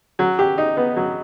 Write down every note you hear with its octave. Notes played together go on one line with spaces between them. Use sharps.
F#3
G4
D#4
B3
F#3